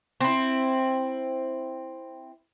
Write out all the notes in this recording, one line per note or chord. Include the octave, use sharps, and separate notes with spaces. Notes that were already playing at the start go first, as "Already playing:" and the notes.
C4 E4